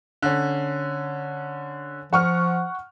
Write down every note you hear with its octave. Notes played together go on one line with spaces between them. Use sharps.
D3 C#4
F3 F#5 C#6 F6